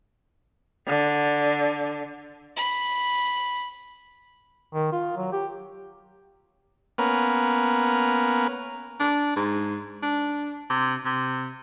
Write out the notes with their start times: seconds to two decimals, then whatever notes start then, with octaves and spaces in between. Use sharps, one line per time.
0.88 D3
2.56 B5
4.74 D#3
4.93 F4
5.17 F#3
5.33 G4
6.98 A#3 B3 C#4 A#4 B4
9.00 D4
9.36 G#2
10.03 D4
10.70 C3
11.05 C3